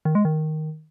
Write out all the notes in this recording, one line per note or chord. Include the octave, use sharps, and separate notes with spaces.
D#3
G#3
D#3